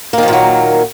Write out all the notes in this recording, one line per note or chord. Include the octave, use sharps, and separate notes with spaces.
A#2 D#3 F3 F#3 A#3